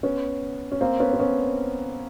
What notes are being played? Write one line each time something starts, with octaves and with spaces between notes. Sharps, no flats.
B3 C#4
C#4
A#3 C4
B3 C#4
C4
B3 C#4